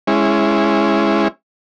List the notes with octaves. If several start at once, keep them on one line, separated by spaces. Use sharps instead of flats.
G#3 C#4 E4